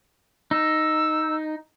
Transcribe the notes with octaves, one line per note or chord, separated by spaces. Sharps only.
D#4 E6